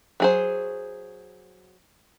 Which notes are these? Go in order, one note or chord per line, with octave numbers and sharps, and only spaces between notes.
F#3 G#4 C5